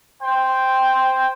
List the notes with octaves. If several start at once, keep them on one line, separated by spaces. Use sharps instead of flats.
C5 G5